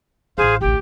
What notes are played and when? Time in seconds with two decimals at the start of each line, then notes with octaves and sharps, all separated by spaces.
0.38 A1 F4 G#4 C5 F5
0.61 A1 D2 G4 G5